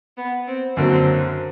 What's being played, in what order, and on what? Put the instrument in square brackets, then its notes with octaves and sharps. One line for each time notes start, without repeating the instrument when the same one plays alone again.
[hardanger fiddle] B3
C4
[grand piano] F#2 D3 F#3 A#3 [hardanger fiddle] C4